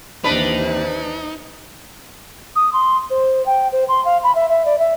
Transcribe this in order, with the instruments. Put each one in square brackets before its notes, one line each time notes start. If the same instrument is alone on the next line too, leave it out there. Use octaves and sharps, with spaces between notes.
[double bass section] D#2 E3 [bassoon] C3 [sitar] D4 B4 [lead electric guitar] D#4
[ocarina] D#6
C6
C5
G5
C5
C6
F5
B5
E5
E5
D5
E5